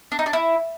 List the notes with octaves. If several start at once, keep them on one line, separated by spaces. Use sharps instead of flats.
D4
D#4
D4
E4